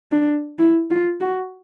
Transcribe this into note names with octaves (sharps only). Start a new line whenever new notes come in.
D4
E4
F4
F#4